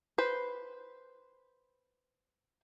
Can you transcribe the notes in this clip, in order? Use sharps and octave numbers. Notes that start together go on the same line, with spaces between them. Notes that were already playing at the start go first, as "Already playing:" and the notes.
B4 C5